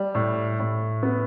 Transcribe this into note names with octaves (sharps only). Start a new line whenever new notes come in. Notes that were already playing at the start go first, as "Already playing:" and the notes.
Already playing: G3
A2
A2
B3